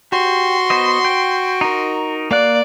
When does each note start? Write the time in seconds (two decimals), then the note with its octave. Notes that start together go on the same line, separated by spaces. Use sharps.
0.12 F#4 G4 C6
0.70 B3 C5 D#5
1.05 G5
1.61 D#4 A#4
2.31 A#3 D5 F5 F#6